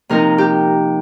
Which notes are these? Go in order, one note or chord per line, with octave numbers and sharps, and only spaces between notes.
C3 F3 A#3 D#4 A#4
G4